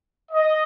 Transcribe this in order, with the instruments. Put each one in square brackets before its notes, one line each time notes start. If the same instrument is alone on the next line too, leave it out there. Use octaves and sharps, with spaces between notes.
[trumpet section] D#5